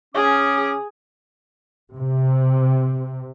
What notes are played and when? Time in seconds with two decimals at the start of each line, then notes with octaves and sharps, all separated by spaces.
0.15 C#3 C#4 G#4 D6
1.95 C3